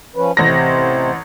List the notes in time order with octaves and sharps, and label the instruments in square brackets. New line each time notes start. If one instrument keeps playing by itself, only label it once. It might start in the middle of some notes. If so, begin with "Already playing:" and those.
[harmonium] F3 C#4 B4
[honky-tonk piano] A1 A#6 [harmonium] C3 C5